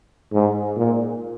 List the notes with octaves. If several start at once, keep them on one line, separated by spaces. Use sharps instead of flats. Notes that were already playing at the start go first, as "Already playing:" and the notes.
G#2
A#2